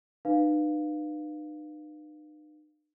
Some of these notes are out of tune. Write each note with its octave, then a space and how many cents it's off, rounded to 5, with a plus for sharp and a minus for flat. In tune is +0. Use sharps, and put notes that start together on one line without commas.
D#4 -40 B4 +0 F5 +0